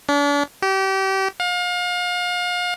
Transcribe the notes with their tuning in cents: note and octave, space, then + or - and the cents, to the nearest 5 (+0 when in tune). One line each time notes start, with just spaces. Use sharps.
D4 -40
G4 -30
F5 +35